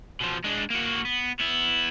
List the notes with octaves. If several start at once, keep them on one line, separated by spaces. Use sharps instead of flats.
B2 F3
G#3 D4
A#3 F#4
B3
B3 E4